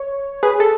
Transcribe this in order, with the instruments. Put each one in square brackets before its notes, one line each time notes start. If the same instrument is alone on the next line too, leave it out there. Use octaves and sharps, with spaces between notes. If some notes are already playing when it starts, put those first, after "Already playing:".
Already playing: [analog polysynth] C#5
G#4 B4
A4